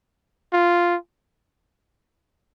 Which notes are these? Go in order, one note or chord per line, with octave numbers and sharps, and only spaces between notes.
F4